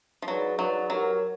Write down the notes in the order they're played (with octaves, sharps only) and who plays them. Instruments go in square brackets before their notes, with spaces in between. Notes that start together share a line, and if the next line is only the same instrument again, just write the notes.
[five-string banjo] F3
[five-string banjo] F#3 [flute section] D#4 G#4 B4 D5
[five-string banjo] F#3 [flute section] D#4 G#4 B4 D5
[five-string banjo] F#3 [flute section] G4 A#4 C#5